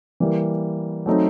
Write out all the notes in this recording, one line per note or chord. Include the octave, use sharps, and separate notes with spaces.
E3 G3 A#3
F#3 A3 C4 D#4